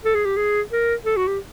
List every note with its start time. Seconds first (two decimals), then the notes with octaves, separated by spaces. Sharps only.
0.05 A4
0.15 G#4
0.25 G4
0.36 G#4
0.72 A#4
1.05 A4
1.17 F#4
1.28 G4